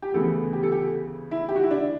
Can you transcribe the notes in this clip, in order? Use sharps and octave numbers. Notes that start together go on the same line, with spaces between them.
G4
D2 C#3 E3 B3 A4
G4
A4
G4
E4
G4
F#4
E4
D4